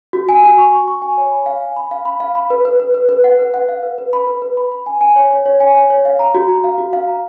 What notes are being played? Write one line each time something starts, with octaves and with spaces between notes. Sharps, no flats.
F#4
G#5
F#4
C#6
C#6
C#6
G#5
C#5
B5
F5
G#5
B5
F5
B5
F5
B5
B4
B4
B4
B4
B4
F#5
B4
F#5
F5
B4
B4
B5
B4
B4
B5
B5
G#5
G#5
C#5
C#5
C#5
G#5
C#5
C#5
F5
A#5
F#4
A#5
F5
F#4
F5
A#5